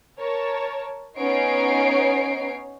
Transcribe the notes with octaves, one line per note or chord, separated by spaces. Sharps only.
A#4 C#5 A5
B3 C#4 D#4 C#5 C7 D7